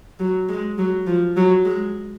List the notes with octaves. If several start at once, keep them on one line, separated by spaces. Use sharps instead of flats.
F#3
G#3
F#3
F3
F#3
G#3